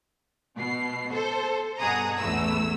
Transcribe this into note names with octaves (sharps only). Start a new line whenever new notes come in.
B2 C7
A4 C5
G2 B2 G#4 F#5 A#5 D#6
A1 E2 A3 E6